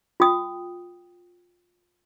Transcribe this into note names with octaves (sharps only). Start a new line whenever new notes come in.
F4 G5 D#6